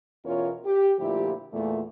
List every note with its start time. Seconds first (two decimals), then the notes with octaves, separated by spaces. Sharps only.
0.24 E2 B2 C#4 F4 A#4 C#5
0.64 G4
0.98 D2 A#2 F3 E4 G4
1.53 E2 A#2 A3